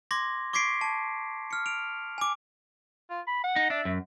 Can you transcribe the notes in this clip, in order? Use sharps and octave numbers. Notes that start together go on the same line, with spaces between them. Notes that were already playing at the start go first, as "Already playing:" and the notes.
C6 D6 G#6 A#6
C#6 D6 G#6 B6 C7 D7
A5 G#6
F6 C#7
D7 F7
G#5 D6
F4
B5
F#5
D#4
D4 E5
F#2